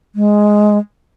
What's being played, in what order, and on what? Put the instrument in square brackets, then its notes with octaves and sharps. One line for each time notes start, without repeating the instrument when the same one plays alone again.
[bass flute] G#3